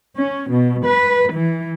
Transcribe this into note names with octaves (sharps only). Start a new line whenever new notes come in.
C#4
B2
B4
E3